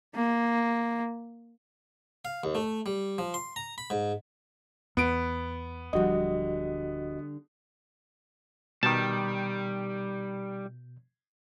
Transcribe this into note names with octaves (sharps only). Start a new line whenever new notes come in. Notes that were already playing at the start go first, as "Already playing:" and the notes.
A#3
F5
D#2
A3
G3
F3
C6
A#5
B5
G#2
E2 B3 D7
D1 D3 F3 G3 F#4 D#5
B2 D#3 G3 A5 G6